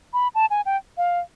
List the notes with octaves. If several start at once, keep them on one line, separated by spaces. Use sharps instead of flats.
B5
A5
G#5
G5
F5